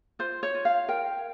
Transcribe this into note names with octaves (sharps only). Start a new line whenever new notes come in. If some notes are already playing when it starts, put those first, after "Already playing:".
F4 C5
C#5
F4
F5
A#4 G5